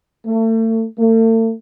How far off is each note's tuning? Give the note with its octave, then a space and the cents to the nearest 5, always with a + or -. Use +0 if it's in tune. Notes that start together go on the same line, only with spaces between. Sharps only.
A3 +35
A3 +40